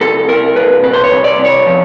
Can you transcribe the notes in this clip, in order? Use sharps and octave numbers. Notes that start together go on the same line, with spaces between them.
C2 A4
C2 A#4
C2 B4
A#2 B4
C5
C#5
C2
D5
C2
C#5
F3